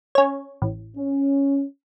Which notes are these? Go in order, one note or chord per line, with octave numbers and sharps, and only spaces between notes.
C#4 C#5
A1
C#4